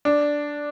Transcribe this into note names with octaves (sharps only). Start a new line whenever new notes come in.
D4